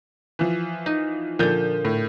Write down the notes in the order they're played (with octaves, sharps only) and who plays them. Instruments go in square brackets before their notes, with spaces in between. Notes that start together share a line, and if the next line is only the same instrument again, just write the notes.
[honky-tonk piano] E3 F3
[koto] D#4
[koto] A#2 D3 [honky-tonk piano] F3 G6
[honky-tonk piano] A2